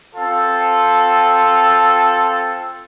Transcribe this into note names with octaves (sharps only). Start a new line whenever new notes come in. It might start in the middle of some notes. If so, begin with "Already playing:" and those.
C4 F4 A4